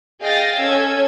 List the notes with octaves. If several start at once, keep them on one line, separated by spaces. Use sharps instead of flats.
G#4 D#5 F5 G5 A6 A#6
C#4 A4 E6 G#6